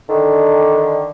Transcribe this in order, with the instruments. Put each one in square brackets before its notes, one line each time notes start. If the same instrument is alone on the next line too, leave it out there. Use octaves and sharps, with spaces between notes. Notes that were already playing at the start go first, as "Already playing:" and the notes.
[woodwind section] D3 D#3